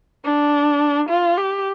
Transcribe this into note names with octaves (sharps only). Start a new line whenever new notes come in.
D4
F4
G4